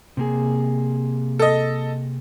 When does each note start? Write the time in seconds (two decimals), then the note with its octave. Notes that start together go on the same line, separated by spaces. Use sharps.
0.17 C3 A#3 G#4
1.39 A4 D#5